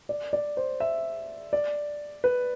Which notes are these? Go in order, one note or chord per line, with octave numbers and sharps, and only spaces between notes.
D5
D5
C5
E5
D5
B4